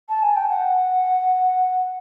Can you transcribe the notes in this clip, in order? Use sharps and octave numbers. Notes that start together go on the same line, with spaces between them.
A5
G#5
G5
F#5